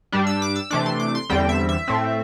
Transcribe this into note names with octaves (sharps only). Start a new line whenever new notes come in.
G2 G3 D4
E6
D6
E6
C3 E3 A3 D4 D6
C6
D6
C6
E2 D3 G3 C4 G5
E5
E5
A2 A3 C4